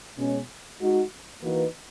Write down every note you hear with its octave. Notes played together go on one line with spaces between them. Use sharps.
B2 G#3 C#4
G#3 D#4 F#4
E3 A#3 D#4 F#4 B4